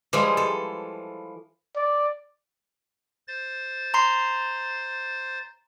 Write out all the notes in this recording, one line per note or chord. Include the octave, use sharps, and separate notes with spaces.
E3 F3 G3 G#3
A4
D5
C5 A6
A#5 C6 C7